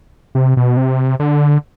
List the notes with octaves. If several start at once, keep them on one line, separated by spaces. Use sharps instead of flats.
C3
B2
C3
D3